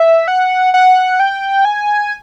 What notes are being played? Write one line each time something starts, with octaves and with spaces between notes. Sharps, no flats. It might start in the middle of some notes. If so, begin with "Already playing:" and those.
Already playing: E5
F#5
F#5
G5
G#5